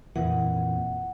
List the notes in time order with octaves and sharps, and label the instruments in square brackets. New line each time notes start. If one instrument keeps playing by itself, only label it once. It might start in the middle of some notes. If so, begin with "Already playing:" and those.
[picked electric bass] F2 A#2 E3 [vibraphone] F#5